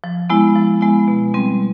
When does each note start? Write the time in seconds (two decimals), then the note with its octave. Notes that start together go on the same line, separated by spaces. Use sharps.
0.04 F3
0.30 G#3 B3 E4
0.55 F3
0.81 G#3 B3 E4
1.08 B2
1.34 G3 C4